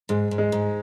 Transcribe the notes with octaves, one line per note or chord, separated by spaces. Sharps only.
G#2 G#3
G#2
G#3
G#2